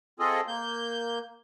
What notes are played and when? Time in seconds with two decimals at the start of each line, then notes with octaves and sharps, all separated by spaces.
0.20 C4 F4 G#4 A4 D#5
0.48 A#3 G6